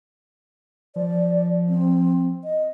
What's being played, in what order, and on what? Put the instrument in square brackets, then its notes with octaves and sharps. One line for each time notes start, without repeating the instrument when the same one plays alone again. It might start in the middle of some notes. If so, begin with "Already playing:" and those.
[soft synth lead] F3 [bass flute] D5
[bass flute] C4
D#5